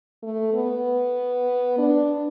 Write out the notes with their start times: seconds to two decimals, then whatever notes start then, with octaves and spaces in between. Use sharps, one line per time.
0.23 A3
0.54 B3
1.78 D4